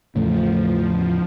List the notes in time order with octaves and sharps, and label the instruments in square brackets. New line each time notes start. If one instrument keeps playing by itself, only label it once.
[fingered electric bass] E2 A2 C#3 [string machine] F3 [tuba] A3